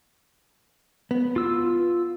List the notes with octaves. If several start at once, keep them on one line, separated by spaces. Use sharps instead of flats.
B3
F4 E6